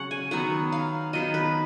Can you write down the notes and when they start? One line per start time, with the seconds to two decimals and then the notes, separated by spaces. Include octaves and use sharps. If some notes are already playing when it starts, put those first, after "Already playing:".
Already playing: C#3 F#3 C#4 C#5 F#5
0.11 G#5
0.31 D#3 F#3 B3 F#5
0.72 F5
1.13 D#3 F#3 B3 D#5
1.34 B4